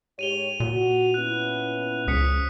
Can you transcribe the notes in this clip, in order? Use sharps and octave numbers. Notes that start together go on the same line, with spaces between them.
G#2 G4 C#5 D#7 F7 G7
A#2 F#4
B3 C#4 E4 F#6
C#2 C#3 F3 D#6 B6 C#7